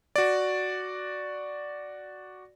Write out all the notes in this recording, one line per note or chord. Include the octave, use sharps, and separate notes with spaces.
F#4 D5